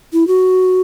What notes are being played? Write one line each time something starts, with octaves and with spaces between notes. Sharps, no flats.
E4
F#4